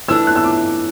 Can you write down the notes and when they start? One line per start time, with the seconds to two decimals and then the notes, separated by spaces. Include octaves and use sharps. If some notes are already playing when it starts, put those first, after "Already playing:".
0.08 E3 A3 D4 E6
0.27 F#6
0.36 E6
0.44 D6